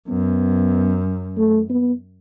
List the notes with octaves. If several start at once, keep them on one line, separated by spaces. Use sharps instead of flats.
F#2 B3
A3
B3